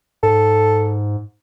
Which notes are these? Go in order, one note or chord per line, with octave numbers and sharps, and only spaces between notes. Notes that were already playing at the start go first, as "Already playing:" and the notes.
G#2 A4